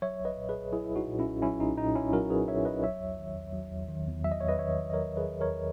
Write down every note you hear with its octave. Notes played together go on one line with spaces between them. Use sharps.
F#3 C#5 E5
B1
B4 D#5
A#2
G#4 B4
B1
F#3 E4 G#4
E4
B1
D#4 F#4
A#2
C#4 E4
B1
F#3 C#4 E4
B1 D#4
A#2 D#4
B1 C#4 E4
F#3 F#4 A#4
B1 G#4 B4
A#2 C#5 E5
B1 B4 D#5
F#3 C#5 E5
E2
D#3
E2
F#3
E2
D#3
E2
F#3 E5
D#5
E2 C#5
B4 D#5
D#3 C#5 E5
E2
D#5
F#3 A#4 C#5
E2
G#4 B4
D#3
A#4 C#5
E2